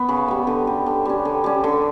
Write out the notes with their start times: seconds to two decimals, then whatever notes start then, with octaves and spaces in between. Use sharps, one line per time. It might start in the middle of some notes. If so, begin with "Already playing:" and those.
Already playing: B3
0.09 C#3
0.28 G3 B3
0.47 D3
0.67 G3 C#4
0.86 D3
1.05 G3 C#4
1.25 D3
1.44 G3 C#4
1.64 D3